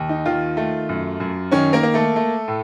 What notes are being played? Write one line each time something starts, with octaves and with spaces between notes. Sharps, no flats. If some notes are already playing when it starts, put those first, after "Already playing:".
Already playing: D#2
D#4
D#3 F4
A3
F#2
F#2
D#3 C#4 C#5
A#3 A#4
A#3
A3 A4
A3
A2